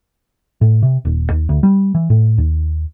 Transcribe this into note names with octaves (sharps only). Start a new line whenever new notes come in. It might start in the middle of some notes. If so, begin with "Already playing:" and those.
A2
C3
D#1
D#2
D2
G3
E3
A2
D#2